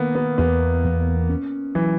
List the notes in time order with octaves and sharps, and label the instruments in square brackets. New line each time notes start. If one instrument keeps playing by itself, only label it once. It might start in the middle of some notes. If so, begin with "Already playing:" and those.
Already playing: [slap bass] D#3 [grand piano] A#3 B3
[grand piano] B3
[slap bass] E2 [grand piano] B3
[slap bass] E2
C#4
[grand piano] E3 [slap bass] F#3